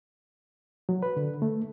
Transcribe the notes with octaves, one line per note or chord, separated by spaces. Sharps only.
F#3
B4
D3
A3